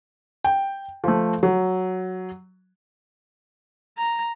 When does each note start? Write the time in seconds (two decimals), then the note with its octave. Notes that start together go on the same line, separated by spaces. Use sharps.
0.44 G5
1.04 F3 A3
1.43 F#3
3.98 A#5